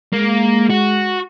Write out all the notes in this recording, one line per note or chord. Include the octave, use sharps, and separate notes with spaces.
G#3 A#3
F#4